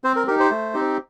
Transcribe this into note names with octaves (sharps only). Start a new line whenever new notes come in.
C4 C5
A#4
D#4 G4 A#4
C5
A3
C4 D#4 G4